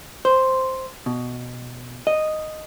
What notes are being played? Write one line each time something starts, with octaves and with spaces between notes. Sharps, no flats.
C5
B2
D#5